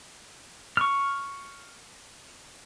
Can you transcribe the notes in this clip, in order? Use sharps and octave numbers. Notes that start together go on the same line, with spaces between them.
C#6 F6